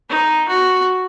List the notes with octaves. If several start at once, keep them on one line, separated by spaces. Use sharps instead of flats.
D#4
F#4